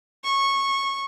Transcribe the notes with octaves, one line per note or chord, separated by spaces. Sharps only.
C#6